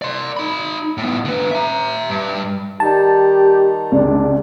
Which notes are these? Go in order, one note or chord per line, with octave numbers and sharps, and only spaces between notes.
D5 C6
D#4 B5
A2 B3
D3 B4
E5 A#5
G2
D#3 G3 D#4 G4 A5
C#2 C3 D4 D5